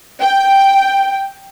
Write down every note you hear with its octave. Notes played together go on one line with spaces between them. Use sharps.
G5